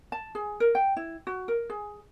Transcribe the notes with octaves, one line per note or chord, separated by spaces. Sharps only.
A5
G#4
A#4
G5
E4
F#4
A#4
G#4